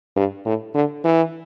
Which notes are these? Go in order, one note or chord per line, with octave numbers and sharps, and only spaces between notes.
G2
A2
D3
E3